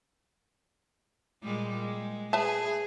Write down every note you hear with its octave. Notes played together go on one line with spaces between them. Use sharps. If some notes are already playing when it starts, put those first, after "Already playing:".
A#2 G3 G#3
G#3
G#4 B4 E5 A5